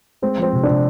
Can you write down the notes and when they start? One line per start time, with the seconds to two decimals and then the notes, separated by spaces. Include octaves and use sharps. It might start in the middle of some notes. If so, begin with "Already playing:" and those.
0.22 G#3 C4
0.38 F3 C4
0.53 C3
0.63 C3 D4